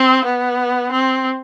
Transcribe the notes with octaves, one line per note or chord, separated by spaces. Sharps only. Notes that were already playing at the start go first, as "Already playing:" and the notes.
Already playing: C4
B3
C4